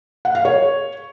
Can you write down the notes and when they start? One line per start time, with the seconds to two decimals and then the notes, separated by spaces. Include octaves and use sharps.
0.25 F#5
0.35 F5
0.45 C#5